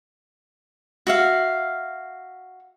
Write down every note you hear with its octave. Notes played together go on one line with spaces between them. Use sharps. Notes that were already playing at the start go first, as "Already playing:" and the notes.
F#4 E5 F5